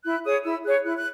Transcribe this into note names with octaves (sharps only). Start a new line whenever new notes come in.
E4 F#6
G#4 C#5 D#6
E4 E6
G#4 C#5 F#6
E4 F#6
F#6